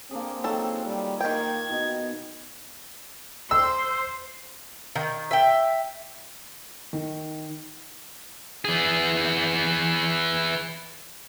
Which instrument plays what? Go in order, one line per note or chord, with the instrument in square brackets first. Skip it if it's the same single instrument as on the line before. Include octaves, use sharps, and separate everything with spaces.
[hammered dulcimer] A#3 D4 G#4 [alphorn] C4
[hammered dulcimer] D#3 F4 [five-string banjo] F#3 A4
[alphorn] G3
[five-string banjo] D#3 G5 [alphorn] A#3 [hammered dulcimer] A#5 [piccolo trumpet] G#6
[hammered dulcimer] B2 [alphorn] D#4
[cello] C5 [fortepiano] E6
[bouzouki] D#3
E5 G5
[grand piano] D#3
[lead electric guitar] E3 G#4